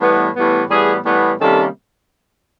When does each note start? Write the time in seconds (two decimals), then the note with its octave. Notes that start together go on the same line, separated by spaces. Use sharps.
0.01 A2 E3 G3 B3
0.35 A2 E3 G3 B3
0.70 A2 E3 G3 B3 G#4
1.05 A2 E3 G3 B3
1.40 C3 D#3 G3 A#3 C#4 A4